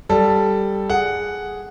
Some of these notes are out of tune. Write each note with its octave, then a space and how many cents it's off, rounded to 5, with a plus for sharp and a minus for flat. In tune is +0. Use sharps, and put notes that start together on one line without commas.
G3 +0 A4 +0
G#4 +0 F#5 +0